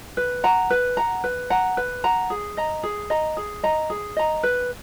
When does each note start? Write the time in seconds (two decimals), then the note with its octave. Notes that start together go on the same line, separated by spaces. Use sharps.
0.17 B4
0.44 F#5 A#5
0.70 B4
0.97 F#5 A#5
1.24 B4
1.50 F#5 A#5
1.77 B4
2.04 F#5 A#5
2.30 G#4
2.57 D#5 A#5
2.83 G#4
3.10 D#5 A#5
3.37 G#4
3.63 D#5 A#5
3.90 G#4
4.17 D#5 A#5
4.43 B4